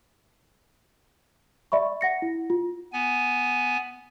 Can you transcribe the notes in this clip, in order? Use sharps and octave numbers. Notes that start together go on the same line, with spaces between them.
D5 E5 B5 C#6
F#5 A#6 C#7
E4
F4
B3 G#5